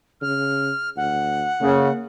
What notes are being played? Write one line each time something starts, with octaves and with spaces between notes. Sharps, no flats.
C#3 F6
D2 F#5
C#3 A#3